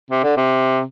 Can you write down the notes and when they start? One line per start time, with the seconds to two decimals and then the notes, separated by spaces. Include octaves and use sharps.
0.11 C3
0.24 D3
0.37 C3